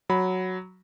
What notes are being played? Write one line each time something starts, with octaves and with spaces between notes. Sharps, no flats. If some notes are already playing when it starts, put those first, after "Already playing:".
F#3 B5